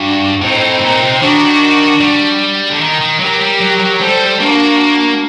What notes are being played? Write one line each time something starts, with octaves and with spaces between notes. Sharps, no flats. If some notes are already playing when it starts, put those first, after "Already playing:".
Already playing: G2 D4 F#4
A2 C4 D#4
A#2
C3
D#3 D4 F#4
G3
D3
D#3
D#3
F#3 G4 A#4
G3
F#3
F#3
G3 A4 C5
A#3 D4 F#4